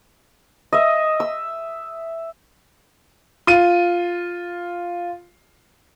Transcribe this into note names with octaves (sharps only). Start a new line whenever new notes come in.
D#5 E5
E6
F4 D#7